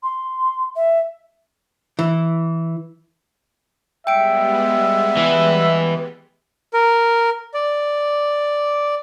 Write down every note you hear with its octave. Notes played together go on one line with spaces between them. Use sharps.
C6
E5
E3
G3 G#3 B3 E5 G5 D7
E3
A#4
D5